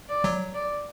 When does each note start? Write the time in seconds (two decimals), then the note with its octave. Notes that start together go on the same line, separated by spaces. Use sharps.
0.09 D5
0.24 F#3
0.54 D5